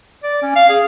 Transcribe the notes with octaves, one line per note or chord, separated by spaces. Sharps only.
D5
C#4
F5
G#4